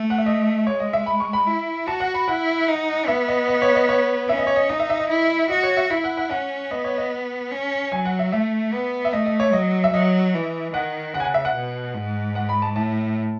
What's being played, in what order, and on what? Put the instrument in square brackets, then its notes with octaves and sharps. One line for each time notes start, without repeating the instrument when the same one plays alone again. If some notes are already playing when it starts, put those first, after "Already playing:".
Already playing: [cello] A3
[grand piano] F#5
E5
D#5
[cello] G#3 [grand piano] C#5
[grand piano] D#5
E5
B5
C#6
B5
[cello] E4
[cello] F#4 [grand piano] A5
[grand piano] F#5
B5
[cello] E4 [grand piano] F#5
[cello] D#4
[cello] B3 [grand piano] E5
[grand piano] D#5
D#5
C#5
D#5
C#5
[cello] C#4 [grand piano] E5
[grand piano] D#5
C#5
D#5
[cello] D#4 [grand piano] D#5
[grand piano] E5
E5
D#5
[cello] E4
[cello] F#4 [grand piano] D#5
[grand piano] C#5
E5
[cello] E4 [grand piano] E5
[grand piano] F#5
F#5
[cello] C#4 [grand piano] F#5
[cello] B3 [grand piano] D#5
[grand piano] C#5
D#5
[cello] C#4
[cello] F#3 [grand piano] G#5
[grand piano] F#5
E5
[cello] A3 [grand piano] E5
[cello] B3
[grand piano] E5
[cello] A3 [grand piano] D#5
[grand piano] D#5
C#5
[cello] F#3 [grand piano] D#5
[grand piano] E5
[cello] F#3 [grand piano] D#5
[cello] E3
[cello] D#3 [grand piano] F#5
[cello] C#3 [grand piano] F#5
[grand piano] G#5
F#5
E5
F#5
[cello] B2
G#2
[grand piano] F#5
B5
A5
[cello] A2 [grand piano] A5